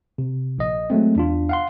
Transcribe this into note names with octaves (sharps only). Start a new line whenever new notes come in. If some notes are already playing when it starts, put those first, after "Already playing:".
C3
A#1 D#5
F#3 G#3 A3 C4
E2 D4 F4
F5 F#5 C6